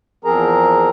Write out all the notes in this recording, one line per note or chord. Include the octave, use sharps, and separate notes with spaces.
E2 F3 C4 G#4 A#4 A#5